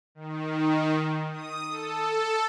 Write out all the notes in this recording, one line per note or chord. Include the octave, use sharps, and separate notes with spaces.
D#3
D#6
A4